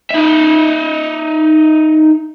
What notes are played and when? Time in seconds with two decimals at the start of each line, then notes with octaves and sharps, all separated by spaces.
0.10 D#4 E5